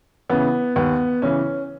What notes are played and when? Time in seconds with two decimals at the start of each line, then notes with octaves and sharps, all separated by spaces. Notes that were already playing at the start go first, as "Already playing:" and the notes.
0.30 C#3 E3 B3
0.76 D#2 B3
1.22 C#3 E3 C#4